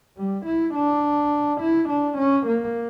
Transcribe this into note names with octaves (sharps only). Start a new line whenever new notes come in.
G3
E4
D4
E4
D4
C#4
A#3